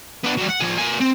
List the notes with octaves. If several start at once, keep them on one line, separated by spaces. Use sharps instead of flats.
B3 D4
F#3 G3
F#5
F3 G#4
A#3 G#5
C4